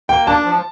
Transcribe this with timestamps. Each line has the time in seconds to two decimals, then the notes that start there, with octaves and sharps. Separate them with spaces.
0.09 A#3 G5
0.27 D4 A5
0.45 F3